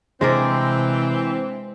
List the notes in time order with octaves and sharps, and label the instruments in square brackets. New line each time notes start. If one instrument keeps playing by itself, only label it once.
[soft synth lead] C3 [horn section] E3 C4 [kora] G#3 A#4 D5 [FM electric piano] D4 C5